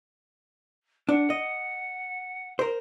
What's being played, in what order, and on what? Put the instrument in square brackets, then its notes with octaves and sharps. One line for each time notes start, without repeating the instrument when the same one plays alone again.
[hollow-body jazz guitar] D4 [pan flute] F#5
[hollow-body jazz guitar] D#5
A#4 C5